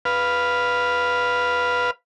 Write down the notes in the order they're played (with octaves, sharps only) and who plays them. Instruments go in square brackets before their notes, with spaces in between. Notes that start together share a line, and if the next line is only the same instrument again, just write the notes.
[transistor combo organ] B4 F5